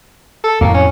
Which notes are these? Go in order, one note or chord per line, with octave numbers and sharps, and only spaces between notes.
A4
F2 A2 A#3
C#4